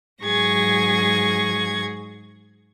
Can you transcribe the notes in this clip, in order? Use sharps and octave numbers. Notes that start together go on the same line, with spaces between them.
G#2 F#3 G#4 C#6 G#6 A#6